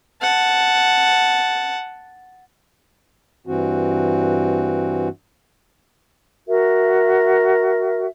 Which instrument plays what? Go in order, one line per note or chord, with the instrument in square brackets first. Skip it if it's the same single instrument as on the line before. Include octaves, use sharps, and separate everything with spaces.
[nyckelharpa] F#5 A5
[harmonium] G2 E3 C4 F#4
[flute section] F#4 A#4 E5